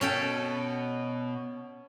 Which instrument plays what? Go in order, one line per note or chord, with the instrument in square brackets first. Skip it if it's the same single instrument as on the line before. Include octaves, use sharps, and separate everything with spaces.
[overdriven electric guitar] B2 [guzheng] C#4 A4 G5